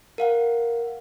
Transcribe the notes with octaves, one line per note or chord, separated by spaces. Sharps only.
A#4 F5 F#5